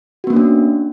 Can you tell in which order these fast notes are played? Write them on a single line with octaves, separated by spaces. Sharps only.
F#4 B3 A#3 C#4 D4